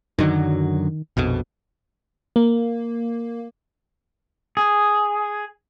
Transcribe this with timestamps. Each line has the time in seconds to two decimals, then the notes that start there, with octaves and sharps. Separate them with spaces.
0.19 F#2 D3 D#3 F#3
1.17 A#1 F2 B2
2.36 A#3
4.57 G#4